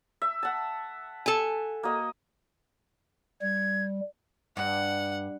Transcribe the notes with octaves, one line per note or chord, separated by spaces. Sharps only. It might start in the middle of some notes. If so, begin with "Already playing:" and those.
E5
F#5 A5
A4 G#5
A#3 F#4 D#5
G3 G#6
G2 F#5